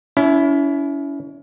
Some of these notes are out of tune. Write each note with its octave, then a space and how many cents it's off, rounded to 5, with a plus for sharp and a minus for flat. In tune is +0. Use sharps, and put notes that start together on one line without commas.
C#4 +35 E4 +0